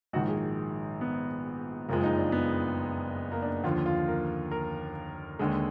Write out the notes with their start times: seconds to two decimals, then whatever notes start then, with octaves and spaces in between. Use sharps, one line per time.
0.13 A#1 G#2 D#3 F#4
0.28 G#4
1.01 B3
1.89 F#1 F2 F3 G#3 A#3
2.04 D#4
2.18 D4
2.32 B3
3.32 A#3
3.42 D4
3.64 D#2 D3 F3 F4
3.86 F4
4.08 A#4
4.51 A#4
5.39 D#2 D3 G#3